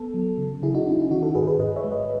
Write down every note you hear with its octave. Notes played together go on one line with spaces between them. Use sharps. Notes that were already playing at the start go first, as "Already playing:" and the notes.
Already playing: B3 A4
F#3
C#3
C#3 E4 G#4
D#4 F#4
C#4 E4
E4
D#3 D#4 F#4
F#4 A4
G#2 G#4 B4
G#4 B4
G#2 B4 D#5
C#5 E5
G#3
B4 D#5